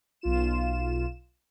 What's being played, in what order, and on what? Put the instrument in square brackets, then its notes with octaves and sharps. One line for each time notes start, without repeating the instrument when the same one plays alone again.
[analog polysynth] B1 F4 E7